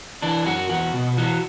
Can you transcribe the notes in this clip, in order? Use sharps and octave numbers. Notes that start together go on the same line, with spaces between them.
E3 D4
F#2 F#4
E2 F#4
B2
E3 F#4